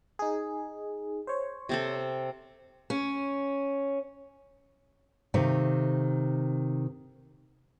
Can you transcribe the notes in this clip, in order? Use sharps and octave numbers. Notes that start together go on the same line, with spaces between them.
D#4 G#4
C5 C#5
C3 C4 A4
C#4
C3 D#3 A3 F5